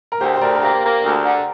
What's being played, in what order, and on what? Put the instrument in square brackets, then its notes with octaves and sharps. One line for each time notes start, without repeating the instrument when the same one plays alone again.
[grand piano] A#4
[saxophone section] D2 [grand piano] G4 C5
[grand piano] C5
[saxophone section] D2 [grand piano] A#4 D5
[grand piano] A#4
[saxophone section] A#3 [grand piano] G4 C5
[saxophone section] A#3
D2
D3